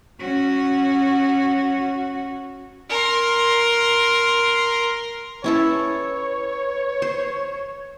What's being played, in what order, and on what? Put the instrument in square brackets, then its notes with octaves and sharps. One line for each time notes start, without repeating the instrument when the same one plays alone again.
[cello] C#4 F#4
[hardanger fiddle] A#4 C6
[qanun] C#4 E4 A4 [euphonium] B4 [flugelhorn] C#5
[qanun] C5